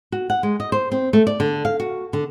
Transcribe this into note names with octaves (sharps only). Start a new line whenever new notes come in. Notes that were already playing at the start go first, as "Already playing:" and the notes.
F#4
F#5
G#3
D#5
C5
C4
A3
D5
D3
F5
F#4
D3